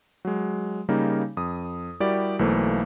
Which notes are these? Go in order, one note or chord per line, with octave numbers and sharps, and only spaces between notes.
F#3 G#3
C#3 G3 A#3 D#4
F2 D#6
G3 E4 F#4 G4 A#4 D5
B1 E3 A3 A#3 C5